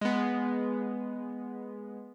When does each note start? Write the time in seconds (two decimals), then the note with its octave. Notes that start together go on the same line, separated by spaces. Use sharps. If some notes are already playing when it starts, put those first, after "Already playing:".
0.01 G#3 B3